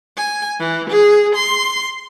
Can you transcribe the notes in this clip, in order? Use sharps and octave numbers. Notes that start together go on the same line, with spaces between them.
G#5
E3
G#4
C6